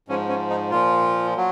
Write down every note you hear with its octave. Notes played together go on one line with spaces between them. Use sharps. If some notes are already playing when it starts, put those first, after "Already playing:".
G#2 F3 C#4
C#4
D#4
A#2 F3 F4
F#3